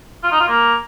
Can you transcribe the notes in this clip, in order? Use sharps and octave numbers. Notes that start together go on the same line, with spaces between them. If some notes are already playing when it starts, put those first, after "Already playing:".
F4
D#4
F4
A#3